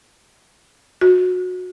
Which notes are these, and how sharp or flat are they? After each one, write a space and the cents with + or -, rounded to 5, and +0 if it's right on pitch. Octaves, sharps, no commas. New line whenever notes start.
F#4 -20